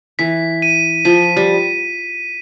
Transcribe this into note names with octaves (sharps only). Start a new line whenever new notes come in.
E3 B6
D#7
F3 B6
G3